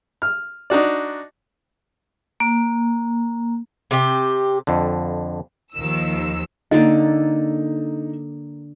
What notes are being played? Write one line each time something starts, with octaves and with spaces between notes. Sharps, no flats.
F6
D4 D#4 F#4 D5
A#3
C3 G4
F2 D3
D#2 D#3 F3 E6
D3 A#3 D#4 A4